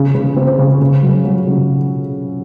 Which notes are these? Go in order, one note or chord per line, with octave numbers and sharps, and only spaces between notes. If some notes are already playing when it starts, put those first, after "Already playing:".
Already playing: C#3
C#3
C4
C#3
C#3
F#3
F#3
C#3